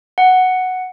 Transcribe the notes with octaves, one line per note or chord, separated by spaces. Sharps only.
F#5